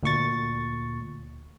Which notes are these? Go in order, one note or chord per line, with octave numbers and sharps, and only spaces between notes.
D2 A#2 C#6 A6